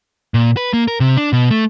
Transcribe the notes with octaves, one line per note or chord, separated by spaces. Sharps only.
A#2
B4
A#3
A#4
C3
D4
B2
A3